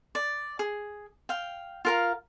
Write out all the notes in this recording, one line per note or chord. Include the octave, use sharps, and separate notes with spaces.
D5
G#4
F5 G5
F4 A#4 F5